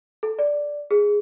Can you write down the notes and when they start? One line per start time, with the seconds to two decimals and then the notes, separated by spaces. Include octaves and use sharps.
0.23 A4
0.39 D5
0.91 G#4